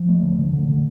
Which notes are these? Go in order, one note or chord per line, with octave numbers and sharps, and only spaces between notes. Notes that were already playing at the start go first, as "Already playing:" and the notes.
Already playing: F3
A3
D3
D3
D3
D3